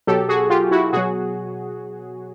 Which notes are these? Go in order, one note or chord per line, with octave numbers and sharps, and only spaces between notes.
B2 F#3 G4 A4
F#4 G#4
F4 G4
E4 F#4
B2 F#3 F#4 G#4